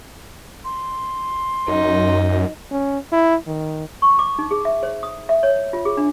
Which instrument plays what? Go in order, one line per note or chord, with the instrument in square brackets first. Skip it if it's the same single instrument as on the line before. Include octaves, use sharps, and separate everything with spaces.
[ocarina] C6
[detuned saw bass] F#2 [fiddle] D#4
[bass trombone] C#4
E4
D#3
[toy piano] C#6
D6
D#4
G#4
E5
C5
D#6
E5
C#5
F4
G#4
D4